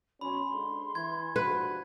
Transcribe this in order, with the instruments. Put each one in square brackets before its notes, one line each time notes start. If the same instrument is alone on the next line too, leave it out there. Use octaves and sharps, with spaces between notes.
[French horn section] B2 F#3 C#4 [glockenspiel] B5 [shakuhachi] C6
[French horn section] G#2 D3
[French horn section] E3 [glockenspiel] G#6
[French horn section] G2 F3 F#4 [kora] B4